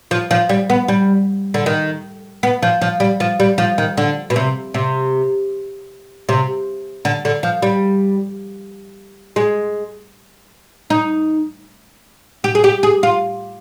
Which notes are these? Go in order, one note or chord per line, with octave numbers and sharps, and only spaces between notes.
F3
F3
G3
B3
G3
D3
D#3
B3
F3
F3
G3
F3
G3
F3
D#3
D3
B2
C3
C3
C3
D3
D3
F3
G3
G#3
D#4
G4
G#4
G4
G#4
F4